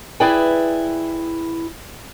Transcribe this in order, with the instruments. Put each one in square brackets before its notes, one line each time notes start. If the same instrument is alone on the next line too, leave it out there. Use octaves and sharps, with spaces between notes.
[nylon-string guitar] E4 G#4 B4 D5 G5 G#5